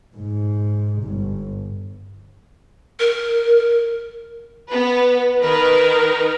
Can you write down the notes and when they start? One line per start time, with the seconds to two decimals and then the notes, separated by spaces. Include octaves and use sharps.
0.13 G#2
1.03 G1
3.00 A#4
4.68 B3 B4
5.42 D#3 A#4 B4